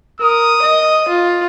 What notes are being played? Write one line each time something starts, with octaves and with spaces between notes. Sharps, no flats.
A#4 D#6
D#5
F4